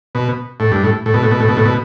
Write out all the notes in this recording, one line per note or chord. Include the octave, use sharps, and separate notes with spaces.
B2
A2
G2
A2
A2
B2
A2
B2
A2
B2
A2
B2